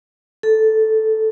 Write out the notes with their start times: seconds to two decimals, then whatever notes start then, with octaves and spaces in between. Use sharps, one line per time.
0.43 A4